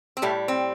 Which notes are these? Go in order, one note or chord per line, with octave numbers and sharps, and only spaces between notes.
C4
A2 G3 A3
C4